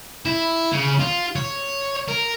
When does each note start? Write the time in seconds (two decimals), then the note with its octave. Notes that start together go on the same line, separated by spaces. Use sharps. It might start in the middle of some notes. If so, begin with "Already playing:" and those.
0.25 E4
0.72 C#3
1.00 F4
1.36 C#5
2.08 A#4